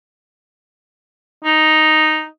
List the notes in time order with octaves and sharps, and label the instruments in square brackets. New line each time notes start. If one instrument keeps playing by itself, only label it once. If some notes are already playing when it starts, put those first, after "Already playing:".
[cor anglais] D#4